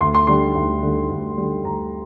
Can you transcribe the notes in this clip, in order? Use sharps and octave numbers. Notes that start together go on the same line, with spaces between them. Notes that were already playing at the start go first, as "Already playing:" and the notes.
D2 C6
C6
D3 G3 C6
D2
D3 G3
D2
D3 G3
D2 A#5